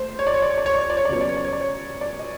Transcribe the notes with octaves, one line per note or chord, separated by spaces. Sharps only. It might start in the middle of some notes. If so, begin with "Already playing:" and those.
Already playing: A3 C5
C#5
D5
C#5
D5
C#5
D5
C#5
D5
C#5
D5
C#5
D5
C#3 F#3 B3 C#5
D5
C#5
D5
C#5
D5
C#5
D5
D#5